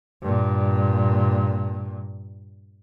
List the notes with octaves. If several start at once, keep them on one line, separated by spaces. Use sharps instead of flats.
G2 A#2